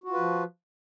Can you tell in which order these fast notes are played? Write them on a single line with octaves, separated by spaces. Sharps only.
F#4 F4 B4 F3